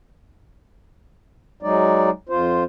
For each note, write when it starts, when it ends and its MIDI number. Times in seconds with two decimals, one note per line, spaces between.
1.63 2.10 54
1.63 2.10 56
1.63 2.10 63
1.63 2.10 74
2.29 2.64 41
2.29 2.64 65
2.29 2.64 72